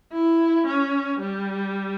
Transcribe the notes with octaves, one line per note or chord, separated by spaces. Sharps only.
E4
C#4
G3